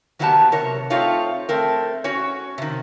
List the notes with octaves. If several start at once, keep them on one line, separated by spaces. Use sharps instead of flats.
D#3 F#3 A#3 B3 G4 A5
C3 A#4 C#5
A3 C4 D#4 F4 C#5 F5
A3 C4 A#4
C#4 F#4 C#5
C3 D#3